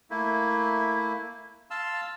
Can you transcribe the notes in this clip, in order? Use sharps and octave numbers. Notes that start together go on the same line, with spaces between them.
A3 A#3 E4
F5 A5 C6 E6